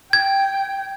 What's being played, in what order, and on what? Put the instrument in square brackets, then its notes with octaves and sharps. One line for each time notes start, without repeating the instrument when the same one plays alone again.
[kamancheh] G5 [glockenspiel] G#6